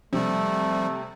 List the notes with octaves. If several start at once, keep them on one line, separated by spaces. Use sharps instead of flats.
C3 F3 G3 A3